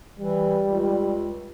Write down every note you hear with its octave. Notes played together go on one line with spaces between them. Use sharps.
E3 G3
C#2